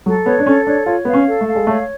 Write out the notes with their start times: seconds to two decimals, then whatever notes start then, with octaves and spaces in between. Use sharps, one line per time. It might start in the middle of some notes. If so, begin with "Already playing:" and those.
0.06 F#3 A4
0.26 B3 C#5
0.39 D4
0.46 C#4 A4
0.67 D4 C#5
0.86 F4 C#5
1.05 B3 F5
1.13 C#4
1.27 A4
1.41 A3
1.47 F5
1.55 G#3
1.67 A3 C#5